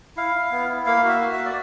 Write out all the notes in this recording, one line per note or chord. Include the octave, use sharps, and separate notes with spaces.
E4 F5
E4
B3
E4
A#3 F5
F#4 E5
F#4
E5
A#3
D5